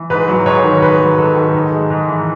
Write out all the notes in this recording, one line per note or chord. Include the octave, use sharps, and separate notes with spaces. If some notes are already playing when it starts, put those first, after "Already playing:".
Already playing: E3
G#2 B4
F#3
G#2 C#5
D#3
G#2 B4
F#3
G#2 A4
D#3
G#2
G#3
G#2
E3